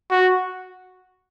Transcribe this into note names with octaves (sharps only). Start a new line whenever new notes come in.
F#4